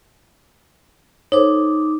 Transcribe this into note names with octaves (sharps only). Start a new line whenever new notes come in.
D#4 A4 C5 C#5 D6